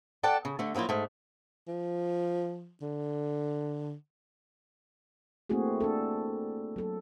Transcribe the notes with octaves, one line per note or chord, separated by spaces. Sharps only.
A4 D5 F#5 G5 A5
C#3
D3 A3
F3 F#3 A#3 E4 F4
G#2 A3
F3
D3
A3 A#3 C4 E4 F#4 G#4
D4 A4
F#3 A4